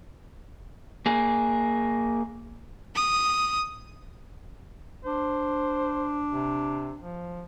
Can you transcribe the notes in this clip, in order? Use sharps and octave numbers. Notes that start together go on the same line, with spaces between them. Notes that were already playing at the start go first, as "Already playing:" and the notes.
A#3 G#4
D#6
D4 C5
C3
F3